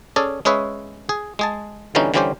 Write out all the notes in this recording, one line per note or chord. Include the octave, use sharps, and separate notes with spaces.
C#4 G#4 A4 D5
G#3 C#4 G#4 B4 C#5 E5
G#4
G#3 G#4 A5
B2 D3 E3 G3 C#4 D#4
D3 E3 G3 C#4 G4 C5